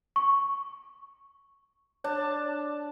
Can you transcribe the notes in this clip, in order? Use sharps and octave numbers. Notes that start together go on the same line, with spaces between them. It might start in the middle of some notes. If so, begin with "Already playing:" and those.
C#6
D4 C#5 A5